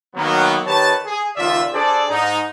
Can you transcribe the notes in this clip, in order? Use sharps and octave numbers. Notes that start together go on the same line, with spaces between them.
D#3 F#3 A#3 B3
D#3 G4 B4 C#5 A5
G#4
C#2 D#3 F4 D5 E5
D4 G#4 A4 C5 D5
G#2 D#4